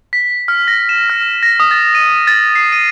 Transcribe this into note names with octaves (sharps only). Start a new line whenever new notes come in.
B6
F6
A#6
E7
F6
A#6
D#6
A6
D#7
A6
C7
D#7